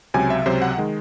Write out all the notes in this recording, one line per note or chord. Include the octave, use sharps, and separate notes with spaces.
C#2 C3 F#3 G#5
E5
C#2 C3 F#3 C5
F#5
D#3 G#3